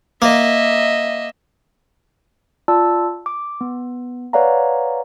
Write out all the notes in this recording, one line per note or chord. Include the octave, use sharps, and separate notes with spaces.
A#3 D#5 E5
F4 D5 A5 E6
D6
B3
B4 C#5 D5 F5 F#5 A#5